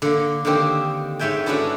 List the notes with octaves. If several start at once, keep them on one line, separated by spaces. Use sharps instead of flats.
D3 A#3
D3 D#3 A#3 C4 G4 C5
G#2 C#5 E5 G5 G#5
B3 C#4 D4 E4 F#4 A4